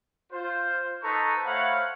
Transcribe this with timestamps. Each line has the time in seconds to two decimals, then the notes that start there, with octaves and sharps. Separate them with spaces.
0.32 F4 C5
1.03 D#4 A4 B4 C5 A#5 C#6
1.45 A3 C5 C#5 F5 F#5 B5